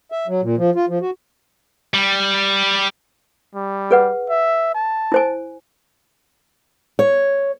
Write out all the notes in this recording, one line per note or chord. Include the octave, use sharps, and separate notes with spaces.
E5
F#3
A#2
F3
F4
F3
F#4
G3
G3
G#4 B4 F#5
E5
A5
E4 C5 G#5
C#5